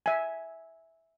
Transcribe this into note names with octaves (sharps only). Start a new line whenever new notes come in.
E5 G#5